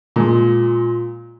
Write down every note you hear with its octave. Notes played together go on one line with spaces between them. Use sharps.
A#2 G#3